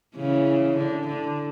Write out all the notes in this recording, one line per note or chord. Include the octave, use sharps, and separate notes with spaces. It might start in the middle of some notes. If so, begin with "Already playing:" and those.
C#3 E3
D3
D3